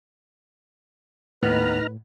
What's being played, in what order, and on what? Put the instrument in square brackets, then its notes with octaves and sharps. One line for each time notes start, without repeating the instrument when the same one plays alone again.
[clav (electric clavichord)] D#2 B3 [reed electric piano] A2 [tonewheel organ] D#4 A#5 F6 [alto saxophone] B4